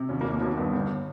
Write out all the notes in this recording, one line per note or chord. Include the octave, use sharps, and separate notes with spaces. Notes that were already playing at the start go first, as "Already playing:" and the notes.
Already playing: C3
D#2 C#4
A#3
D#2
A#3
D#2 A#3 B3
G2 B3
G1